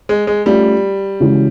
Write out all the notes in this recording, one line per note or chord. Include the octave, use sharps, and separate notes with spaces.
G#3
G#3
G3 A3 C#4 F4
C#3 E3 G#3 C#4 F#4